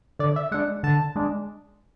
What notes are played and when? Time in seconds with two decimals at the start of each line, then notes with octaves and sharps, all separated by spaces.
0.19 D3 D5
0.36 E5
0.52 G#3 D4 F#5
0.83 D3 A5
1.16 G#3 D4